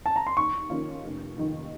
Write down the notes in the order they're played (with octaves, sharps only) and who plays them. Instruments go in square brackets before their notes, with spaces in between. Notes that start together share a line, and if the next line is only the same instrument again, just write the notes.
[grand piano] A5
A#5
C6
[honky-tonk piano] D#2 [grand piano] C#6
[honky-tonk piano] D#3 A#3 C#4 F4
F1
D#2 D#3